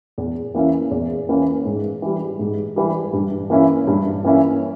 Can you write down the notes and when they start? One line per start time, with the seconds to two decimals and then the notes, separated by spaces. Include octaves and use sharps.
0.18 E2
0.54 E3 A#3 C#4 E4
0.91 E2
1.29 E3 A#3 C#4 E4
1.65 G#2
2.02 E3 G3
2.39 G#2
2.76 E3 G3
3.13 G2
3.50 E3 A#3 C#4 E4
3.87 G2
4.24 E3 A#3 C#4 E4